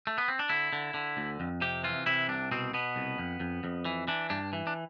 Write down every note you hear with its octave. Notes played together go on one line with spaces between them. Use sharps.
A3
B3
C4
D4
D3 E4
D3
D3
D2
F2
C3 G4
E3 F4
C3 E4
C2 D4
B2 C4
B2 B3
C2
F2
F2
F2
E3
E3 D4
G2 D4
E3
D4